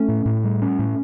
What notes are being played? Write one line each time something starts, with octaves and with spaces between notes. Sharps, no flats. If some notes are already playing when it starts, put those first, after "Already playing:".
Already playing: A3 C#4
A2
A2
G3
C#4
A2